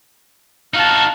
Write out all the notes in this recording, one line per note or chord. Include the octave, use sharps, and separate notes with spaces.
D#4 F#4 F5 A5